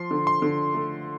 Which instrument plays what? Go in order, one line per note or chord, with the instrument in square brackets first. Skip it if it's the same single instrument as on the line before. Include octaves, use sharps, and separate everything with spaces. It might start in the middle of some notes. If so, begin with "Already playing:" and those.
Already playing: [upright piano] F3 [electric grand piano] C6
[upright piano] D3
[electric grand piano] C6
[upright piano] D3
A3